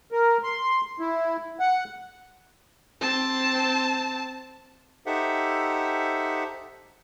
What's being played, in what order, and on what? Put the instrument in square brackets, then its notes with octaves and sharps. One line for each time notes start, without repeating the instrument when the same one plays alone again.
[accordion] A#4
C6
E4
F#5
[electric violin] C4 A5
[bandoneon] D#4 G4 A4 C5 E5 F#5